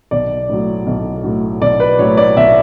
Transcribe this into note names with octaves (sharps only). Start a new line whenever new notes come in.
B1 D5
A2 F#3
B1
A2 F#3
B1 D5
B4
A2 F#3 C#5
D5
B1 E5